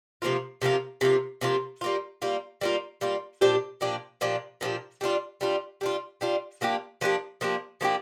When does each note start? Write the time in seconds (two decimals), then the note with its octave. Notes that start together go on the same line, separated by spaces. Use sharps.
0.22 C3 F3 A#3 F4
0.62 C3 F3 A#3 F4
1.01 C3 F3 A#3 F4
1.41 C3 F3 A#3 F4
1.81 G3 A#3 F4
2.22 G3 A#3 F4
2.61 G3 A#3 F4
3.01 G3 A#3 F4
3.41 A#2 F3 D4 G4
3.81 A#2 F3 D4 G4
4.21 A#2 F3 D4 G4
4.61 A#2 F3 D4 G4
5.01 G3 D4 F4
5.41 G3 D4 F4
5.81 G3 D4 F4
6.21 G3 D4 F4
6.61 F3 A#3 D4 G4
7.01 F3 A#3 D4 G4
7.41 F3 A#3 D4 G4
7.81 F3 A#3 D4 G4